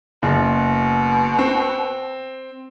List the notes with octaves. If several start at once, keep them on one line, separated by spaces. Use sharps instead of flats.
F#1 B2
C4